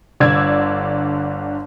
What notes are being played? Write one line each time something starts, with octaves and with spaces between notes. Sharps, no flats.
G1 D3 D5 E6 G#6